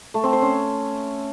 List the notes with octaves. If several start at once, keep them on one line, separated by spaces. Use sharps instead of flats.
A3
C4
C5
C#4